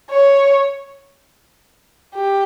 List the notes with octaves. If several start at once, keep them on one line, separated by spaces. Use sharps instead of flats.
C#5
G4